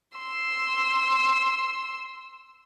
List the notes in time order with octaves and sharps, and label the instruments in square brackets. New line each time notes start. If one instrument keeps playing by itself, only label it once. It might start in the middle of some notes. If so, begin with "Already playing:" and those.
[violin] C6 E6